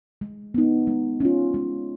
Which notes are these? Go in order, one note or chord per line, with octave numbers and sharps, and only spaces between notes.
G#3
B3 D#4
G#3
C#4 F4
G#3